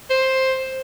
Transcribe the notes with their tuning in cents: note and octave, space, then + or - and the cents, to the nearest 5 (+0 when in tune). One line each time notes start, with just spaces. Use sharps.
C5 +10